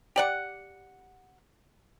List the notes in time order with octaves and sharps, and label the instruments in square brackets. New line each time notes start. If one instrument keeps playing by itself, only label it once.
[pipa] G4 D5 F#5